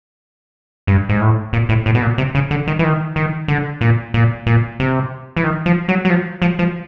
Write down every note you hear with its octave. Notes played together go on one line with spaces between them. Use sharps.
G2
G#2
A2
A#2
A2
A2
B2
A#2
C3
C#3
D3
D#3
E3
D#3
D#3
D3
A#2
A#2
A#2
C3
E3
D#3
F3
F#3
F#3
F3
F3
F3